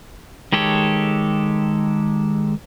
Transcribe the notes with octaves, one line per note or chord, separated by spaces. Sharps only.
D#3 G#3 G4 A4 C#5